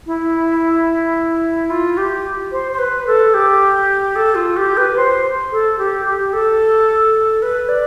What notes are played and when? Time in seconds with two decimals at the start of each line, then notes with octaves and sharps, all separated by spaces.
0.07 E4
1.70 F4
1.97 G4
2.52 C5
2.72 C5
2.79 B4
3.07 A4
3.34 G4
4.16 A4
4.35 F4
4.57 G4
4.77 B4
4.97 C5
5.52 A4
5.79 G4
6.06 G4
6.33 A4
7.42 B4
7.69 D5